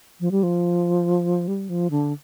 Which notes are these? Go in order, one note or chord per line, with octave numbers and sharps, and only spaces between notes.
F3
G3
F3
G3
F3
D3